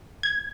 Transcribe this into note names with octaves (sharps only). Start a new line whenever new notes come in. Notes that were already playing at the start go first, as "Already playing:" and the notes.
G#6